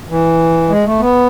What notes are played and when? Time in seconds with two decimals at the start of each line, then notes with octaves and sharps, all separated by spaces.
0.09 E3
0.69 G#3
0.85 A3
1.00 B3